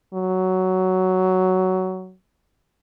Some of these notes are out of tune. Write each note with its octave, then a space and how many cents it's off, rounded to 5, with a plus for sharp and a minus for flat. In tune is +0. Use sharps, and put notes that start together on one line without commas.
F#3 +10